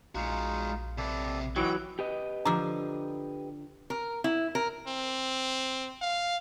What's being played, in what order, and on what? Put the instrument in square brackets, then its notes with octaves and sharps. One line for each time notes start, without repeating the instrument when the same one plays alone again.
[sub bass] A#1 [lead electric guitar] G#3 F#4 [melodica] D#4 F4
[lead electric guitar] C3 B4 [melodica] A4 D5
[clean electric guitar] E3 F#3 [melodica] D#5 F#5 C#6 [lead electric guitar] G5
[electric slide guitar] G4 B4 D#5
[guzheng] D3 F3 [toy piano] A#5 D6 E6
[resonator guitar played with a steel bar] A#4
E4
A#4
[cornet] C4
F5